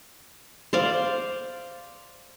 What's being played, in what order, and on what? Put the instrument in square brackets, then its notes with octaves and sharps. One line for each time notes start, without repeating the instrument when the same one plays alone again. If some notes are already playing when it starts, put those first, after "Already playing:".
[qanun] C5 D5 F5